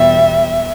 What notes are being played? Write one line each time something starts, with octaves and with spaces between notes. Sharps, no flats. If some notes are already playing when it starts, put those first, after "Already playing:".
Already playing: E2 B2 G3 E5